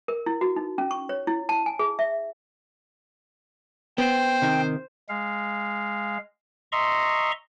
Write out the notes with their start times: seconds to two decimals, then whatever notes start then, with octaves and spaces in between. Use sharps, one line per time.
0.08 A#4
0.26 E4
0.41 F#4
0.56 D#4
0.78 C#4
0.91 C#6
1.09 C#5
1.27 E4
1.49 A5
1.66 G#5
1.79 G#4
1.99 E5
3.98 B3 C5 G5
4.42 C3 D#3
5.09 G#3 F5
6.72 D#5 E5 A#5 C6 C#6